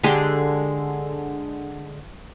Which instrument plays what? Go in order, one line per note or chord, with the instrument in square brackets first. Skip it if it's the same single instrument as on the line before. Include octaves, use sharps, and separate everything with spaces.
[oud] D3 G#3 G4